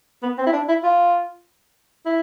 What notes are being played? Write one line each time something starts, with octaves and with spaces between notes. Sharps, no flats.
B3
C4
E4
D4
E4
F4
E4